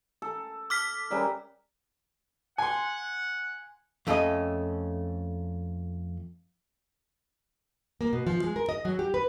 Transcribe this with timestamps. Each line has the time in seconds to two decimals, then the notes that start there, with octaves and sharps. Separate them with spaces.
0.22 A4
0.70 D6 F6 B6
1.11 C#3 G3 A#4
2.58 F#5 G#5 C6
4.07 F2 A3 C#4 F4 D#5
8.01 A#3
8.13 B2
8.27 F3
8.44 G#3
8.56 A#4
8.69 D#5
8.85 F#3
8.99 G4
9.14 B4